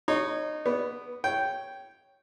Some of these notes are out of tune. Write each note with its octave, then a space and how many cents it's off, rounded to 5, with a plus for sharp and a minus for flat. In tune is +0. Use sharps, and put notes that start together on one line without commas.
D#4 -25 C#5 -5
B3 +0 D5 -40
C#5 +0 G5 -10